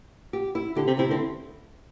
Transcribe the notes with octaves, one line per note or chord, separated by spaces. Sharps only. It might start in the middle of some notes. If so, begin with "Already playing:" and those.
G4
E4
D3 G4
C3
C3 E4
D3 C4